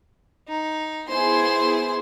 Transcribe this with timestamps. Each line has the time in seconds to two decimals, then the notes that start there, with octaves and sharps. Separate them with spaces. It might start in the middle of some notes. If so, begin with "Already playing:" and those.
0.49 D#4
1.08 B3 E4 G#4 C5 C6